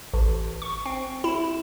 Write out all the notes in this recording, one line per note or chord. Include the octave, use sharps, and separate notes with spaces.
A1
C#6
C4
E4